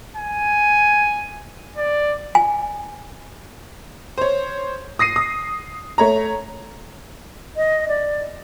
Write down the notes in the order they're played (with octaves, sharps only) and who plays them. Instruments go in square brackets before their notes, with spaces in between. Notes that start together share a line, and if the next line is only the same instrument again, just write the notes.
[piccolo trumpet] G#5
D5
[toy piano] G#5
[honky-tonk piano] C5 C#5
D#6 A#6 C7 D#7
D#6
A3 C#5 A#5
[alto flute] D#5
D5